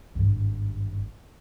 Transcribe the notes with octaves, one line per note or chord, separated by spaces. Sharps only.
G#1 G2